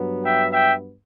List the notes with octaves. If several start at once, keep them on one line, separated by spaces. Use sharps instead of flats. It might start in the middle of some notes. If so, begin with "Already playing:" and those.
Already playing: G2 F#3 B3
E5 G5
E5 G5